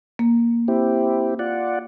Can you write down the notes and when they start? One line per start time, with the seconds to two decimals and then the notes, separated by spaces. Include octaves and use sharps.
0.19 A#3
0.68 C4 E4 G4
1.39 F4 D5 F#5